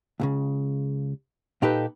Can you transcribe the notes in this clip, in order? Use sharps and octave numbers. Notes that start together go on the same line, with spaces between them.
C#2 A#2 C#3
A#2 D#4 G4 A4 B4